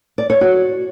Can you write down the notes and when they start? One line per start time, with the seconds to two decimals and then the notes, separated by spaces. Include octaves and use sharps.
0.18 D5
0.30 C#5
0.41 F#4